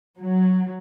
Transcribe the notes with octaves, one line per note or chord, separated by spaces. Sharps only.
F#3